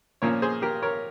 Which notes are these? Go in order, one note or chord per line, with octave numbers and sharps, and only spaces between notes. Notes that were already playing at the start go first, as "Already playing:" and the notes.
A#2 F3 A#3 C#4 A#4 C#5
G#4 C5
G4 A#4
A#4 C#5